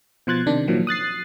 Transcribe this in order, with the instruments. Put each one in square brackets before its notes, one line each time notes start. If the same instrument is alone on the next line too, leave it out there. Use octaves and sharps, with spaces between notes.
[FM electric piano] B2 F3 C6 F#6 G#6 A6
C3 D#3 D4
A#2 D#3 F3 F#3
D#6 F#6 A6 C7